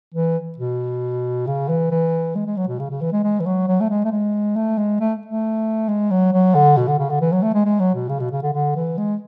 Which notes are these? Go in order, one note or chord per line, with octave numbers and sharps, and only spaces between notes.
E3
B2
C#3
E3
E3
G#3
G#3
F#3
B2
C#3
C#3
E3
G#3
G#3
E3
F#3
F#3
A3
G#3
A3
G#3
A3
G#3
A3
A3
G#3
F#3
F#3
D3
B2
D3
C#3
D3
E3
F#3
A3
G#3
G#3
F#3
B2
C#3
B2
C#3
D3
D3
E3
G#3